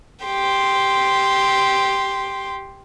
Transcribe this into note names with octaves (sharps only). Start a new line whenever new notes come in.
G4 C6